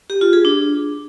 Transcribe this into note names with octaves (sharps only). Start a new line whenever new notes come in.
G4
F4
G#4
D4